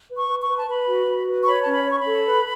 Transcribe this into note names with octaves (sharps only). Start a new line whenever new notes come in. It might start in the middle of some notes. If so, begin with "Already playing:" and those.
B4
C#6
B4
C#6
B4
A5
B4 B5
F#4
F#4
B4
C#6
C#5 B5
C#4 A5
B5
C#5
C#6
B5
A4
B4